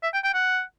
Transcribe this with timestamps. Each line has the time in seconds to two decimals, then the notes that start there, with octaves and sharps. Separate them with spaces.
0.03 E5
0.14 G5
0.24 G5
0.34 F#5